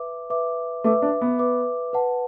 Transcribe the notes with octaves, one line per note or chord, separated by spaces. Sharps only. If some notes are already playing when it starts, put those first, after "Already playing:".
Already playing: B4 E5 D6
B4 E5 D6
A3 B4 E5 D6
D4
B3
B4 E5 D6
B4 F#5 A5